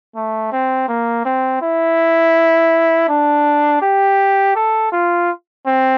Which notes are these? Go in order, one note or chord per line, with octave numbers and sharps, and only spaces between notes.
A3
C4
A#3
C4
E4
D4
G4
A4
F4
C4